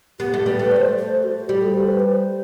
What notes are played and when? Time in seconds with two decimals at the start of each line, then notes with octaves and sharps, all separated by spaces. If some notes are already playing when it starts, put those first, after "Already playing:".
0.20 B3 G4
0.34 A3
0.46 G3 B4
0.59 A3
0.72 D5
0.76 C5
0.98 C5
1.23 F#4
1.49 G3 G4
1.61 A4
1.74 C5
1.87 B4
2.00 C5